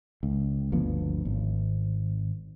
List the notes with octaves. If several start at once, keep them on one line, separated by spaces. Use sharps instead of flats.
C#2
G1 D2 F3 B3
G#1